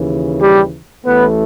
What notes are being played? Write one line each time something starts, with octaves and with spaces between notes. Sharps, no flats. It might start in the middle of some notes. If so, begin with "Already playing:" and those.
Already playing: D#2 C#3 E3
G3 G4
A1 A2 E3 A3 B3 B4